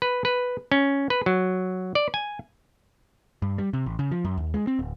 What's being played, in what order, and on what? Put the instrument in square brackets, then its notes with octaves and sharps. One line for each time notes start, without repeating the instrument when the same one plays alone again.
[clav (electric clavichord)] B4
B4
C#4
B4
F#3
D5
G#5
[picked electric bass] G2
G3
C3
A1
C#3
F3
F#2
D#2
G#3
C4
D1